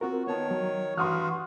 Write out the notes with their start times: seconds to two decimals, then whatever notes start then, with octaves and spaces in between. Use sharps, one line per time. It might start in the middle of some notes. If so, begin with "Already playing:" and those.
0.01 C4 F4 F#4 A#4
0.27 D#3 B3 C#5 A5
0.51 F#3
0.97 G2 E3 F#4 C6 D#6 F6